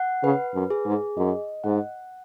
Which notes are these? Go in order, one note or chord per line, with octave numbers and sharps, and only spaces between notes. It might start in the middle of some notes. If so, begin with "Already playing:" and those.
Already playing: F#5
C#3 B4
F#2
G#4
G#2
F#2 D#5
G#2 F#5